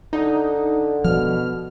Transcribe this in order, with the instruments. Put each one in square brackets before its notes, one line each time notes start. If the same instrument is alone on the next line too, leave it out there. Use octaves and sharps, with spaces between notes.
[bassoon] D3 [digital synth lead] D#4
[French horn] B2 [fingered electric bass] F3 [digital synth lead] F6